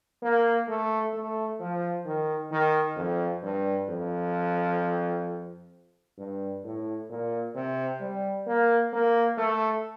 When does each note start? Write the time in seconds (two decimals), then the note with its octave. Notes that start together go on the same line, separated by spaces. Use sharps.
0.23 A#3
0.68 A3
1.14 A3
1.60 F3
2.06 D#3
2.52 D#3
2.96 F2
3.43 G2
3.89 F2
6.18 G2
6.64 A2
7.09 A#2
7.55 C3
8.00 G3
8.47 A#3
8.93 A#3
9.38 A3